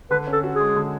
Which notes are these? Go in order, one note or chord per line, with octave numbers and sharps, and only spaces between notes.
D3 B4
C#4
A4
F#4
G#4
G#3
D3